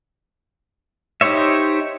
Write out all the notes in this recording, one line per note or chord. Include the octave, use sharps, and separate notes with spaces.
D#4 G4 C5 C#5 E5